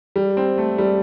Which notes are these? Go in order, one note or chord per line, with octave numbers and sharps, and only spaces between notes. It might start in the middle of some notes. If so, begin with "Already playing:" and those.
G3
C4
A3
G3